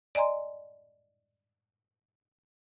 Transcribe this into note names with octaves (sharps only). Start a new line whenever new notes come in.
D5 D#5 G#5 A#5 C6